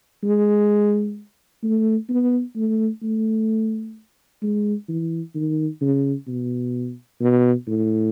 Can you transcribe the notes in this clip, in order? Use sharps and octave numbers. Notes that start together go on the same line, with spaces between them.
G#3
A3
B3
A3
A3
G#3
E3
D#3
C#3
B2
B2
A2